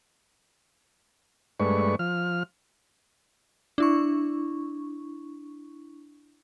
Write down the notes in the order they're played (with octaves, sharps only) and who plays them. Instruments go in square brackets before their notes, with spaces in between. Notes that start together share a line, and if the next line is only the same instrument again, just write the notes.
[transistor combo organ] G2 G#3 A3 D4 B4 C#6
F3 F6
[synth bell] D4 E4 C#6